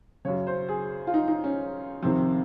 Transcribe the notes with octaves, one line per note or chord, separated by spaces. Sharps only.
F#2 C#3 C#5
C5
G#4
F4
D#4
D#4
C#4
F2 C3 D#3 C4